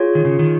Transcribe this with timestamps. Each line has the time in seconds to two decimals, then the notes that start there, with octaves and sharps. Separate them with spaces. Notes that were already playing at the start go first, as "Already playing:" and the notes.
Already playing: F4 G#4 C#5
0.15 D#3
0.25 C#3
0.39 D#3